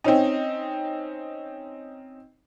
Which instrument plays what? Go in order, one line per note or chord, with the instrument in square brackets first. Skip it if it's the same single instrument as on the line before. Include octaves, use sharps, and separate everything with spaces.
[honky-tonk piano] C4 C#4 D#4